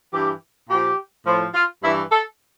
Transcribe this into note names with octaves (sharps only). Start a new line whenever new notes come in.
G2 E3 G4
A#2 F3 G4
A2 F3
F4
G2 E3 E4
A4